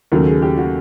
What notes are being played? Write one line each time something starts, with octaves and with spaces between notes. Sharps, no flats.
D#2 C#3 F#3 A3 A#4
G#4
G4
F#4